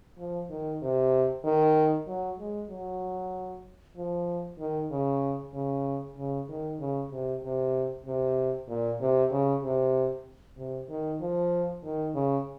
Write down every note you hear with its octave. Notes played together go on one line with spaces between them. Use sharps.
F3
D#3
C3
D#3
F#3
G#3
F#3
F3
D#3
C#3
C#3
C#3
D#3
C#3
C3
C3
C3
A#2
C3
C#3
C3
C3
D#3
F3
D#3
C#3